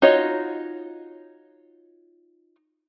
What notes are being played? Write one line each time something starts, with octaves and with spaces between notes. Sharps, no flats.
D#4 F4 F#4 C#5 D#5